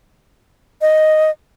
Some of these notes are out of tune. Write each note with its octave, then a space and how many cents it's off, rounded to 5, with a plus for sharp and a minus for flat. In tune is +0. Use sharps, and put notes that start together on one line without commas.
D#5 +0